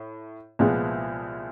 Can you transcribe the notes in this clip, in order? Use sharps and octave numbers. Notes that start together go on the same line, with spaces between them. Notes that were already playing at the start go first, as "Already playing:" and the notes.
Already playing: A2
C2 A#2 F3 G#3 B3